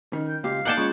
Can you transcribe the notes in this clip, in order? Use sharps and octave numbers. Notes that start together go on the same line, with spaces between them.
D#3 C#4
G5
C#2 A#2 G4 F5
A#3 D#4 A4 D5 F#5 G5 A5 D6
G#3 C#4 F4 C#5